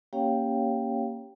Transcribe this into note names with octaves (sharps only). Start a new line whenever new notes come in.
A#3 C#4 G4 C#5 F5 G5